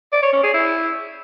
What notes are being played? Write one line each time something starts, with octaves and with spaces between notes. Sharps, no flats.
D5
C#5
C#4
G#4
E4